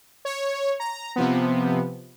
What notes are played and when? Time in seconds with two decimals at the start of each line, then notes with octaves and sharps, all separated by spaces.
0.25 C#5
0.80 A#5
1.16 C3 F3 B3